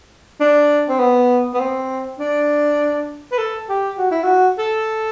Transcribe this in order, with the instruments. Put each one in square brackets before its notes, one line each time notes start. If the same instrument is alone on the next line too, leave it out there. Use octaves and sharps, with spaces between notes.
[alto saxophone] D4
C4
B3
B3
C4
D4
B4
A4
G4
F#4
E4
F#4
A4